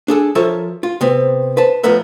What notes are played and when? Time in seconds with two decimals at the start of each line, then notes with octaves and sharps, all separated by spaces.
0.08 D4 G#4 A4
0.35 F3 A4 A#4 C#5 E5
0.83 F4
1.01 C3 B3 C4
1.57 B4 C5 A5
1.83 A2 F3 B3 A#4 B4 E5